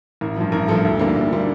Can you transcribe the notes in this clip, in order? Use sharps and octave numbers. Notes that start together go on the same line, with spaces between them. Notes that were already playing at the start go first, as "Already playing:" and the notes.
A1 A#4
G2 F3
A1 A#4
G2 F3 A4
D2
D3 G3 A#3
D2
D3 G3 A#3